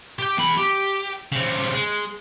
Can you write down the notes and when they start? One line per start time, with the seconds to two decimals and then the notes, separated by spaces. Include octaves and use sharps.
0.19 G4 G5
0.38 E2 B5
0.58 G4
1.32 C#3 C4
1.73 G#3